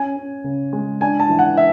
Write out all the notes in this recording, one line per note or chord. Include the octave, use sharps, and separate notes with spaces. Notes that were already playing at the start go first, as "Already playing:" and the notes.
Already playing: C#4 G#5
C#4
C#3
G#3
D4 G#5
A5
E3
F#5
E5